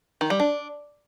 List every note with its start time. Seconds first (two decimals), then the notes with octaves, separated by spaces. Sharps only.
0.21 D#3
0.30 G3
0.40 D4